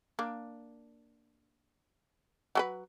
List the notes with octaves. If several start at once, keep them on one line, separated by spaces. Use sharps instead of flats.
A#3 D4
F#3 A4 B4